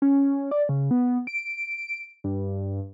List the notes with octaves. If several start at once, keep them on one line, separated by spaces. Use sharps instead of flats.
C#4
D5
C#3
B3
D7
G2